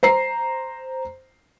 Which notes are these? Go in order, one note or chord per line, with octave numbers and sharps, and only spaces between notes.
C5 A#5 C7